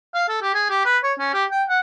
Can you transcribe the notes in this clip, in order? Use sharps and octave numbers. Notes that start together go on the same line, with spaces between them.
F5
A4
G4
G#4
G4
B4
C#5
C#4
G4
G5
F#5